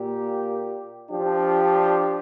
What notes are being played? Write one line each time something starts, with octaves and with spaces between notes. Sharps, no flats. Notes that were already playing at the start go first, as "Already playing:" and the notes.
Already playing: A#2 A#3 G4
F3 D4 G4